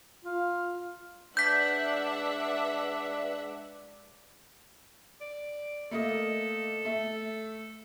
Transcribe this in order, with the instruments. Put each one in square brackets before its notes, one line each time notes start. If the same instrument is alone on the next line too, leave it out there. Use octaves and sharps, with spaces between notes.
[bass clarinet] F4
[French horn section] G#3 B4 D5 [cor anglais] D4 [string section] E5 F#5 [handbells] G6 B6
[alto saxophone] D5
[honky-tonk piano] A3 A#3 D#5 [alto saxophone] A4
[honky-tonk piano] A3 E5